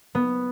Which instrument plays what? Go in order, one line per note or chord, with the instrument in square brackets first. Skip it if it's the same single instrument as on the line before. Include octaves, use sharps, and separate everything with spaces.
[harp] B3